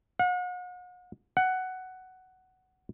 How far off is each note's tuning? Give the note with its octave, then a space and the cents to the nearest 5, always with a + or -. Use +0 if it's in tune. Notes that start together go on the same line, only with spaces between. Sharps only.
F#5 -40
F#5 +10